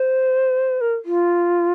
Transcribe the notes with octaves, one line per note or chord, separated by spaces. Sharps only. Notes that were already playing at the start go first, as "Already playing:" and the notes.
Already playing: C5
A#4
F4